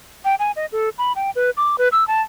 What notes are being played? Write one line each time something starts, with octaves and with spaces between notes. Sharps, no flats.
G5
G#5
D#5
A4
B5
G5
B4
D6
B4
E6
A5